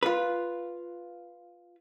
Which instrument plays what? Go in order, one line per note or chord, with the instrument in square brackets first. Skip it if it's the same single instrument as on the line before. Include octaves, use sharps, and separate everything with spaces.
[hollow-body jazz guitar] F4 B4